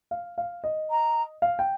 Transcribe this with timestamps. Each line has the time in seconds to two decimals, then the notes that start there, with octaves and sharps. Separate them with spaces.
0.11 F5
0.38 F5
0.64 D#5
0.90 A#5
1.42 F5
1.59 G5